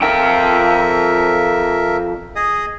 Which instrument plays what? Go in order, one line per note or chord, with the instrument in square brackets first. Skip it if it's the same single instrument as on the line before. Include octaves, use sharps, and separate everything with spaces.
[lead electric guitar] F2 G5 [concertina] A#4 E5
[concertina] G#4 D#5 D#6